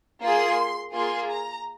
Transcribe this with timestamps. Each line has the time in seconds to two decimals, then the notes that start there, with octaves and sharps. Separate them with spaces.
0.23 A#3 F4 G#4 C6
0.94 A#3 F4 G#4 C6
1.30 A#5